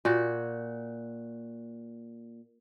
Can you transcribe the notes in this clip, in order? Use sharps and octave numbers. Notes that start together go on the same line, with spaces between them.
A#2 F#4